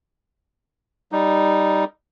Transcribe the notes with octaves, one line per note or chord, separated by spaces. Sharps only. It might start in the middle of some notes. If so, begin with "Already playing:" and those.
G3 D#4